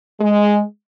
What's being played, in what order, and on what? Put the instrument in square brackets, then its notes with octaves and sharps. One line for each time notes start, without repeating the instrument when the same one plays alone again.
[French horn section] G#3